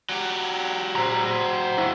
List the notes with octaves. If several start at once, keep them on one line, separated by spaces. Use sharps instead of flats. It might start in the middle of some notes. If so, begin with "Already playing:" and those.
F#3 G4
C5 A#5
E4 F#4